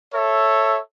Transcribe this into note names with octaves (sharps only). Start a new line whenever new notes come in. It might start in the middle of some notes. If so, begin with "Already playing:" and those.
A4 C#5 E5